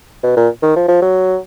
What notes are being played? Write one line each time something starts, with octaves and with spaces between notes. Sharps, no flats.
B2
A#2
D#3
F3
F3
F#3